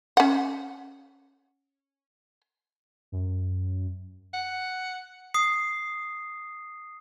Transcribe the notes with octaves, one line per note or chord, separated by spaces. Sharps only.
C#4 F#5
F#2
F#5
D#6 C7